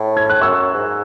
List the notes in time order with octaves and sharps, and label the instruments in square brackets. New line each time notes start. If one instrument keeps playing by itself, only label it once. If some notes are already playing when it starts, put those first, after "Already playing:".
Already playing: [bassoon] A2
[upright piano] G#6
F#6
[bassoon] F#2 [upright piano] C#6 E6
[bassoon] G#2